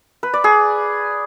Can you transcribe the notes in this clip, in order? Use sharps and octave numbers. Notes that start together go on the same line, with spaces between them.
B4
D5
G#4